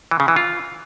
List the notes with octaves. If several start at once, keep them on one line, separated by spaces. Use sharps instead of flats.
E3
C#3
E3
F4